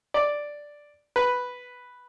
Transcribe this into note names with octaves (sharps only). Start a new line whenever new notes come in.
D5
B4